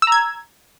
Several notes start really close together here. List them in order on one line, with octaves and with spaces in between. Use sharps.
E6 A#5 G#6